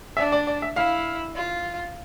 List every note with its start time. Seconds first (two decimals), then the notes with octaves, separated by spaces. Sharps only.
0.17 D4 E5
0.32 D5
0.47 D5
0.62 E5
0.76 E4 F5
1.35 F4